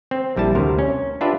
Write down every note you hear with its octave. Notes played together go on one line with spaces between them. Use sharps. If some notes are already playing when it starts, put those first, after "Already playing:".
C4
A#1 G3 E4 A5
D2 C3 A#4
C#4
D4 F4 G4 B4 E5